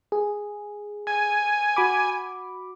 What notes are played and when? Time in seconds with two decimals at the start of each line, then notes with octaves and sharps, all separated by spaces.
0.12 G#4
1.07 G#5
1.77 F#4 B5 D6